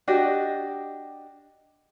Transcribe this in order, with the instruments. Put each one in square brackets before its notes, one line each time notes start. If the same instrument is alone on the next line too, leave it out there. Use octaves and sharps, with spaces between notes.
[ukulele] D4 F#4 G4 D#5